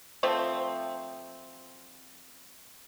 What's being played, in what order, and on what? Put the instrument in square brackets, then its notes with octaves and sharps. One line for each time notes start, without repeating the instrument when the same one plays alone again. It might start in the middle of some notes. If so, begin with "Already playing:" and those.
[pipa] F3 A3 C4